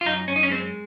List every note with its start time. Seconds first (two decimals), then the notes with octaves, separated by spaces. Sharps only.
0.01 F4
0.05 F#2 D#4
0.28 F#2 C#4
0.36 D#4
0.43 C#4
0.50 G#3 C4